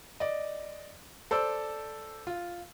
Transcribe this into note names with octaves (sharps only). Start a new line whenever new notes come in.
D5 D#5
A4 C5 D5 E6
F4